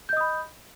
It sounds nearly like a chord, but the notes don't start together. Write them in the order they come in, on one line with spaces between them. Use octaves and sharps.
G6 D#5 D#6 B5